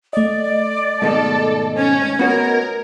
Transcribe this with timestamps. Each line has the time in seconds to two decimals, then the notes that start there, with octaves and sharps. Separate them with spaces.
0.13 A3 D5 D#5
1.02 G#2 B2 D#3 A4
1.77 C#4 G#6
2.19 B3 F#4 A#4 C#5